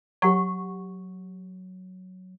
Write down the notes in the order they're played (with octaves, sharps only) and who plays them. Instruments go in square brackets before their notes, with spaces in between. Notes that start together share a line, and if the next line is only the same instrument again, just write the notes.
[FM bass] F#3 [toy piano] G4 F#5 C#6